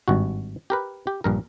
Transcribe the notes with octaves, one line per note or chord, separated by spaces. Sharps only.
G#1 G2 F#4
G4 A#4 B4
G4
A#1 G2 A#4